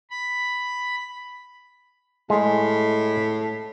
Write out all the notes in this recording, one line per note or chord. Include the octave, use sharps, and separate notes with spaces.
B5
A2 G#3